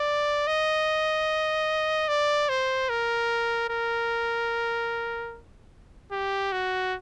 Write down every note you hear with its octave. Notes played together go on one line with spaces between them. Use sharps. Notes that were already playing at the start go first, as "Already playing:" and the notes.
Already playing: D5
D#5
D5
C5
A#4
A#4
G4
F#4